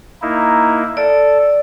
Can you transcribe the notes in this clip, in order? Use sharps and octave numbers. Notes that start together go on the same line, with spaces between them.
A#3 D#4 E4
A4 D5